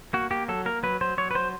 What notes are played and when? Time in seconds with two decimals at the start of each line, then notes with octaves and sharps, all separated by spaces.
0.13 A#3 F#4
0.31 A#3 G4
0.48 F#3 A4
0.65 A#3 A#4
0.83 F#3 B4
1.01 F#3 C5
1.18 F#3 C#5
1.31 B4
1.35 F#3 C5